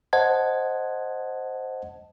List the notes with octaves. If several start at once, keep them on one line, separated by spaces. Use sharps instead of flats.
C5 D#5 F#5 A5 G#6